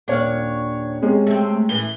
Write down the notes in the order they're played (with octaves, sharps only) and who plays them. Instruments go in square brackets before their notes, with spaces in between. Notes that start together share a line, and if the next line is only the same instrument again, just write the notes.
[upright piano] D#1 C#5 [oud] D4 F5
[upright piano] C3 G#3 C#4
[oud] A3 C4
[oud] A2 E3 [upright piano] G7